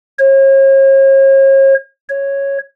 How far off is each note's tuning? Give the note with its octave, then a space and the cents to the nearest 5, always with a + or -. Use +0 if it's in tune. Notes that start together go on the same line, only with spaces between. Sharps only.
C#5 -40
C#5 -5